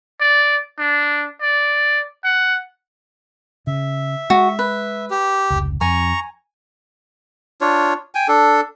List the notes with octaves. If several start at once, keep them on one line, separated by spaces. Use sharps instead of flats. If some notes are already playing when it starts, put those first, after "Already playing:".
D5
D4
D5
F#5
C#3 E5
G#3 F#4
B4
G4
F1 C#2
F2 G#5 A#5 C#6
D4 F4 C#5
G5 G#5
D4 A4